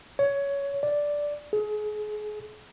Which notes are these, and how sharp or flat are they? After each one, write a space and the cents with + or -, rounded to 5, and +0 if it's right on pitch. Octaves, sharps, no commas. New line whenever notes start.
C#5 +15
D5 -5
G#4 +30